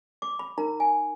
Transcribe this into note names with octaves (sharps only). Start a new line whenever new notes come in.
D6
B5
D#4 A#4 A#5
G#5